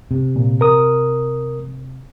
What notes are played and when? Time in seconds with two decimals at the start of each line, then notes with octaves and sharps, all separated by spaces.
0.11 C3
0.36 A#2
0.61 A#4 D#6